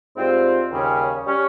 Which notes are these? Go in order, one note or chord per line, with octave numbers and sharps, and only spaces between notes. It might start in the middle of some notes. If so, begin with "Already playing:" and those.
G#2 G3 C4 F4
D#2 C#3 G3 C#4 G#4
G3 C#4